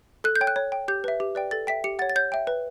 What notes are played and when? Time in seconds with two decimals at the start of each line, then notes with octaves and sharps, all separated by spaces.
0.24 A4 F#6
0.36 G6
0.41 C#5 G5
0.47 F#6
0.56 C#5
0.72 G5
0.88 G4 G6
1.04 B4 E5
1.20 G4
1.35 B4 D5 G5
1.51 A4 A6
1.67 E5 G5 B6
1.84 G4 C#7
1.99 F#5 A6
2.02 C#5
2.10 A6
2.16 C#5 G6
2.32 E5 G5
2.47 B4